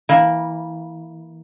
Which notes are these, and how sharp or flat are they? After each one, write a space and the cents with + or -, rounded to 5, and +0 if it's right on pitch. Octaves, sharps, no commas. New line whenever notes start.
E3 -20 A#3 +0